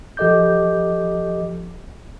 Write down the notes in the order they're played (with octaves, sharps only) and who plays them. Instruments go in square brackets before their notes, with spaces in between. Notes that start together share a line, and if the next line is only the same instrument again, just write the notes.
[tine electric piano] F3 G4 A4 D#5 D6 G6